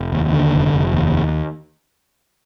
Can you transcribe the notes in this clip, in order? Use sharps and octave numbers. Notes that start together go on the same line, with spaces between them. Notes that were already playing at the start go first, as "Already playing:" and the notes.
Already playing: F1
D#2
D3
F1
F1
D#2